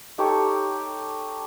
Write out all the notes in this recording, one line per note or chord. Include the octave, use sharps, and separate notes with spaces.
D#4 G4 A4 C#5